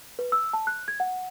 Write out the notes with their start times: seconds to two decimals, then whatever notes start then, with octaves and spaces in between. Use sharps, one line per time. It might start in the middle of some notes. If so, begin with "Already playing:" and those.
0.19 B4
0.32 E6
0.53 A5
0.67 F#6
0.88 G#6
1.00 F#5